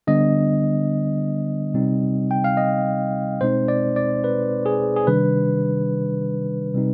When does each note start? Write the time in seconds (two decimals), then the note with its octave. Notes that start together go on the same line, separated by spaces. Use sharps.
0.07 D3 G3 B3 D4 D#5
1.74 C3 G3 C4 D#4
2.31 G5
2.44 F5
2.57 D#5
3.41 B2 G#3 C4 D#4 C5
3.68 D5
3.96 D5
4.24 B4
4.66 G#4
4.96 G#4
5.07 C3 D#3 G3 D4 B4
6.74 C3 G3 C4 D#4